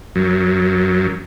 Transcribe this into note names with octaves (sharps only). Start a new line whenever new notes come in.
F#2